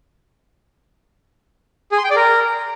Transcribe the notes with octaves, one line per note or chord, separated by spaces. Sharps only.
G#4
C6
G5
D5
A#4